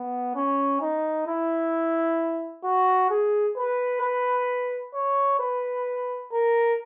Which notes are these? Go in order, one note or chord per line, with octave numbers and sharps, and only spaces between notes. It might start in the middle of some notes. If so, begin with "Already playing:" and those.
Already playing: B3
C#4
D#4
E4
F#4
G#4
B4
B4
C#5
B4
A#4